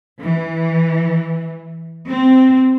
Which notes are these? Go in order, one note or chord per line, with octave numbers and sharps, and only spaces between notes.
E3
C4